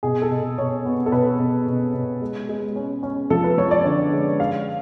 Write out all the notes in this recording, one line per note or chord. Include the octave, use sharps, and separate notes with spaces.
B2 G#4
A4
B2
B2 C#5
B3
A4
B2 B4
B2
B2
B2
G#3
G#3
C#4
C#4
F3 A4
B4
F3 C#5
D5
D3 D5
G#3
G#3 F5